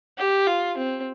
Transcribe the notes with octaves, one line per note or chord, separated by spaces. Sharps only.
G4
F4
C4